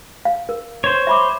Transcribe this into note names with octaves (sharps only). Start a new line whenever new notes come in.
F5
A#4
C5 C#5
E5 B5 D6